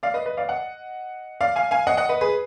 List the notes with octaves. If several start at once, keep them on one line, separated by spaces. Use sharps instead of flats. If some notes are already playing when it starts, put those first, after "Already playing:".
D5 F5
B4 D#5
B4 D#5
D5 F5
D#5 F#5
D5 F5
F5 G#5
F5 G#5
D#5 F#5
D#5 F#5
B4 D#5
G#4 B4